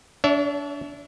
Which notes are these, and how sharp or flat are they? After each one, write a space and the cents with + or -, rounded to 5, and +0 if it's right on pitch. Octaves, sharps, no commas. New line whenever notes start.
D4 -25 C#5 +35 E5 +0